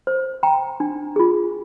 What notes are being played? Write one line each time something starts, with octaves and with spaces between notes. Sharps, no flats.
C5
G5 A#5
D4
F4 G#4